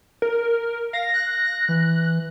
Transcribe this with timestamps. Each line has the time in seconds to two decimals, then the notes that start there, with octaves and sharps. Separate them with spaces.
0.22 A#4
0.93 F5 A#6
1.14 F#6
1.69 E3